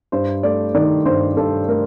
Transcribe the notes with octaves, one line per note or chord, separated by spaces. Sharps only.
G2 C5
A3 D5
D#3 D5
G2 C5
G2 A4
A3 A#4